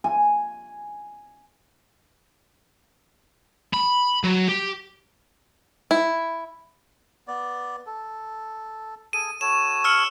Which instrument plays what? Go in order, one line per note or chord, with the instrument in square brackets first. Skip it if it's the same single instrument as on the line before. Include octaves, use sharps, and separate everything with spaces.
[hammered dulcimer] G#5
[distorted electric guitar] B5
F#3
G4
[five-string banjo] E4
[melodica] B3 D5
A4
[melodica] G#4 A4 [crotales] D#7
[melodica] F#4 A4 C#5 [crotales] E7
[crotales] E6 F6 C#7